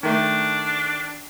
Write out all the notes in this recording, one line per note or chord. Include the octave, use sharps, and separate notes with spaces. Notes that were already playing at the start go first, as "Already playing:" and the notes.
D#3 A3 D4